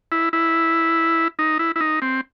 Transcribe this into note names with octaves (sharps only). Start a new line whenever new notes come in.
E4
E4
D#4
E4
E4
D#4
C4